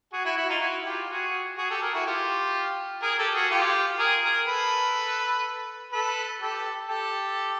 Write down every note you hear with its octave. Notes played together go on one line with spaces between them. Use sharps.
F#4 G#4
E4 F#4
E4 F#4
D#4 F4
E4 F#4
F4 G4
F#4 G#4
F#4 G#4
G4 A4
G#4 A#4
E4 F#4
F4 G4
G#4 A#4
G4 A4
F#4 G#4
F4 G4
G#4 A#4
G#4 A#4
A4 B4
A4 B4
G4 A4
G4 A4